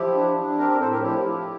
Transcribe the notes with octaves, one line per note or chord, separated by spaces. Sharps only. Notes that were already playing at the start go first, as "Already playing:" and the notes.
Already playing: F3 E4 G4
D4
D4
C4 G4 A#4
G4 A#4
A2 A4 C5
G4 A#4
F3 E4 G4
F3